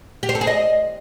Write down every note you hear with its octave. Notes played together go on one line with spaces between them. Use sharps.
G4
C5
A4
G#4
D#5